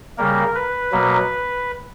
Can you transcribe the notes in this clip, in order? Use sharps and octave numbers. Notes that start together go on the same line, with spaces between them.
C#3 G3 A#3 A#4
B4
B2 F#3 A#3